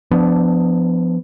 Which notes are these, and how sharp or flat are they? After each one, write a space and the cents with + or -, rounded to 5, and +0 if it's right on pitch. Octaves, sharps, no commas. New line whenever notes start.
F3 +0 B3 +20 D4 +0